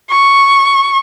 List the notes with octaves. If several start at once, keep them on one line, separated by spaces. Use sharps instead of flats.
C#6